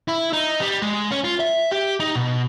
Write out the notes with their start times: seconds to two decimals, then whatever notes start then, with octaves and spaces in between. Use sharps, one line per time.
0.08 E4
0.33 D#4
0.61 G3
0.82 G#3
1.11 C#4
1.24 F4
1.40 E5
1.72 G4
2.00 D#4
2.16 B2